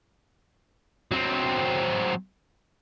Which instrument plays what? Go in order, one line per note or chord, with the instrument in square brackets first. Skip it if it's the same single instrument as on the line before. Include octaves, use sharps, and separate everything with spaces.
[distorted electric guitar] F#3 C4